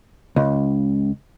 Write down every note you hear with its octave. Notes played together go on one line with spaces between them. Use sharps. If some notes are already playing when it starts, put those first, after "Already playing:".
C#2